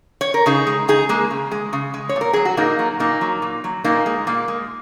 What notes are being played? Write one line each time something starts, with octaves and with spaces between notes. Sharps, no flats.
C#5
A#4
C#3 D#4 G#4
G#3
C#3 D#4 G#4
G#3 A#3
C#3
G#3
C#3
G#3
C#5
A#2
A#4
F#3 G#4
F#4
A#2 A#3 D#4
F#3
A#2 A#3 D#4
F#3
A#2
F#3
A#2 A#3 D#4
G#3
A#2 A#3
G#3